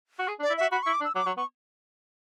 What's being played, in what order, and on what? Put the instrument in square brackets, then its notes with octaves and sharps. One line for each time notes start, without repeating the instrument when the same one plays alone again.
[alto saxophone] F#4
G#4
D4
[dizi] D5
[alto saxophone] E4
[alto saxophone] F#4 [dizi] E5
[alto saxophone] F#4 [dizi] B5
[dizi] C#6
[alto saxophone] E4
[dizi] D6
[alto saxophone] D4
[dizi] E6
[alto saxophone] F#3 [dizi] D6
[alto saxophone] F#3 [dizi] C#6
[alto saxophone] B3 [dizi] C#6